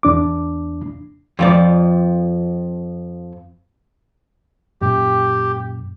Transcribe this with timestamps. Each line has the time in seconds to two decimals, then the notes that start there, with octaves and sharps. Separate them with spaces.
0.03 E2 D4 D6
1.39 F2 F3 D5
4.82 F#2 A#2 G4